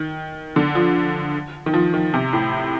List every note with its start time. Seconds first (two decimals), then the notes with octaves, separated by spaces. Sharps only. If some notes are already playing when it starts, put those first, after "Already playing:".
Already playing: D#3
0.56 D3
0.75 F3
1.66 D#3
1.74 F3
1.94 D#3
2.14 C3
2.33 A2